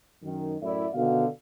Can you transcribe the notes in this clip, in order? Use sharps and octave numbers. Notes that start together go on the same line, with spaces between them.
F#2 D#3
F#2 A2 E4 D5 E5
B2 D3 D#3 F#4 F5